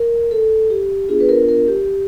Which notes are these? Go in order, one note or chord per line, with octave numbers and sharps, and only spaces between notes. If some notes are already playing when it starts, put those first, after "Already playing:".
Already playing: A#4
A4
G4
B3 D4 F4 G#4
B4
A#4
A#4
G4